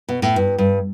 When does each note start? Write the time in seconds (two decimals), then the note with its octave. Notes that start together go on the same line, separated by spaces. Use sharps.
0.09 B2
0.22 A2
0.36 G2
0.58 G2